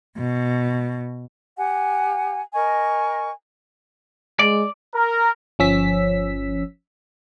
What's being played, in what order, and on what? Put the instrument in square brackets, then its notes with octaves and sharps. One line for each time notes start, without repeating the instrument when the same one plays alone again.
[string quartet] B2
[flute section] G4 F#5 G#5
A#4 D#5 G#5 C#6
[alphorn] G#3 [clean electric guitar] D5
[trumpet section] A#4
[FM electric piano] G1 F3 C#4 E6 B6